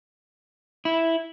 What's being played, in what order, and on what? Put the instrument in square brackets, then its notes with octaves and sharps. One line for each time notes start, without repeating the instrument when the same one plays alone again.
[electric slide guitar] E4